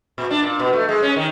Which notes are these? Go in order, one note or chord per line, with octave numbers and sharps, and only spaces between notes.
A#2
D4
A#2
B2
A3
G#3
C#4
D#3